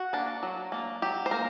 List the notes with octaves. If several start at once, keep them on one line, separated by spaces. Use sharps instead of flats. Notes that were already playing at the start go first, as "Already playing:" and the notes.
Already playing: F#4
A#3 D4
F#3
A#3 D4
F#3 G4
C5
A#3 A#4